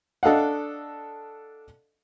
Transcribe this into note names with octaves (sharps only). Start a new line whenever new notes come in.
D4 A4 D#5 F5 F#5